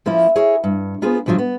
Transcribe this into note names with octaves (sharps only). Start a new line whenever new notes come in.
F3 A#3 C#4 E4
E4 G#4 A#4 C#5
G2
A#3 B3 F4 G#4 B4 C5
G2 C#3 F3 F#3 F4
B3